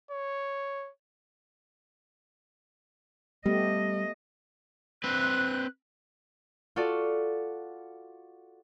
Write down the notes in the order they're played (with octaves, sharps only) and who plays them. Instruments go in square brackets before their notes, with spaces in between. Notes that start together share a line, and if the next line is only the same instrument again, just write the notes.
[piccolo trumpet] C#5
[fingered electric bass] G3 [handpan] A3 B3 G4 [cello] D#5
[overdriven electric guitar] C4 B4 [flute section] F#6
[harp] F4 F#4 A4 D5